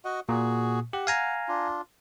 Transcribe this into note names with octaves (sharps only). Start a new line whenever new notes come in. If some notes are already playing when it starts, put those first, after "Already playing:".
F#4 D#5 F#5
A#2 F#4 G#4
G4 F#5
F5 G#5 A#5
D4 F4